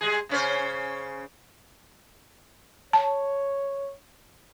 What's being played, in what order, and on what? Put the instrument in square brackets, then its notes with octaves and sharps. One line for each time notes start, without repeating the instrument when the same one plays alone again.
[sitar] G3 G#3 G#4
C#3 C#4 C5
[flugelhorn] C#5 [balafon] A5